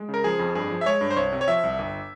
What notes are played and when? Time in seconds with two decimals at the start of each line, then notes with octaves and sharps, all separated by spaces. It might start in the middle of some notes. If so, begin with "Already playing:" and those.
Already playing: G#3
0.09 C#3
0.14 A#4
0.24 F3 G#4
0.39 F2
0.55 G2 G#4
0.71 F3
0.81 E5
0.86 G#3 C#5
1.01 G2
1.11 C5
1.17 C2 C#5
1.32 C3
1.41 C#5
1.48 F3 E5
1.64 C2
1.79 G1